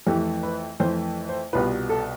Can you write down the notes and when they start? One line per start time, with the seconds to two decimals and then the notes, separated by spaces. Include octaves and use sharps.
0.06 F2 E3 A3 G4
0.43 B4
0.80 F2 E3 A3 C5
1.29 C5
1.53 C2 B2 G3 B3 F4 B4
1.89 A4